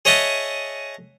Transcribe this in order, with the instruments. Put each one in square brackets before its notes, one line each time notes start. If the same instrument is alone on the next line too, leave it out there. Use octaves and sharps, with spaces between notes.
[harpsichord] G#4 C#5 D#5 E5 F#5 A5